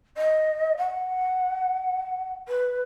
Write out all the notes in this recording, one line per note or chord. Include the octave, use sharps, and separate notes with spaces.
D#5
F#5
B4